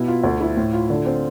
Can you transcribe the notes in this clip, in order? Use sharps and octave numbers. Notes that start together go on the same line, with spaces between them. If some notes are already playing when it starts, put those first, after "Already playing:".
Already playing: B2 E4
F4
D2
E4
A2
F4
D3
C4